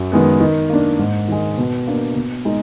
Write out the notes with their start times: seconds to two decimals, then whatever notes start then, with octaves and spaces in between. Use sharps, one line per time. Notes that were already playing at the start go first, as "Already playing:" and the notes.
Already playing: F#2
0.12 D#3 G#3 B3
0.41 D#3
0.70 A#3 D4
0.99 G#2
1.28 D#3 G#3
1.57 B2
1.87 A#3 D4
2.16 B2
2.45 G#3 D#4